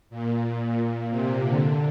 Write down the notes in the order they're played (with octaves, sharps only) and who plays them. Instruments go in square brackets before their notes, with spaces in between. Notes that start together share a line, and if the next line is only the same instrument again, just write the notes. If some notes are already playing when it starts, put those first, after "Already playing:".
[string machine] A#2
C3
D3